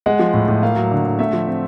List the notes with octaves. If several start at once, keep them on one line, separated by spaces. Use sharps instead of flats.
G#3 F#5
F3
A2
A2
A#3 F5
F#3
D3
D3
A3 E5
F3
C4